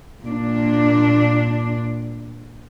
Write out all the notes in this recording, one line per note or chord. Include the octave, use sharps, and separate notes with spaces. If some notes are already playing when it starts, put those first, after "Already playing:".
A#2 D4